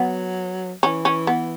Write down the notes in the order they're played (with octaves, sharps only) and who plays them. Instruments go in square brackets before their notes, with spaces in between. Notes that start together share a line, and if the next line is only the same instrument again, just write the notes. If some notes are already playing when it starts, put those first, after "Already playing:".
Already playing: [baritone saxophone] F#3 [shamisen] B3
[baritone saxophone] E3 [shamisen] C#4
[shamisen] C#4
B3